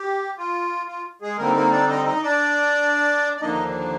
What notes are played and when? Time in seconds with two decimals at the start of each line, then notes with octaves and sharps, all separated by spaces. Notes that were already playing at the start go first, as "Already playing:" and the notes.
Already playing: G4
0.38 F4
0.87 F4
1.21 G#3 G#4
1.38 D3 G3 A#3 C4 D#4 A#4
1.55 A#3 A#4
1.71 D4 D5
1.89 D#4 D#5
2.06 D#4 D#5
2.22 D4 D5
3.36 D5
3.40 D#2 D3 F3 A#3 D4 D#4 D#5